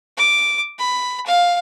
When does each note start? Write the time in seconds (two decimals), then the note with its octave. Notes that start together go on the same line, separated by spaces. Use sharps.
0.17 D6
0.79 B5
1.26 F5